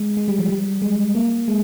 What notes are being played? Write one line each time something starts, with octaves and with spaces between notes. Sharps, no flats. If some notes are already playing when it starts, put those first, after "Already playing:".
Already playing: G#3
G#3
G3
F3
G3
G#3
A#3
G#3